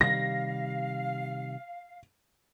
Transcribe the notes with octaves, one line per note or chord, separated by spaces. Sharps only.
C3 D#3 G3 F5 A#6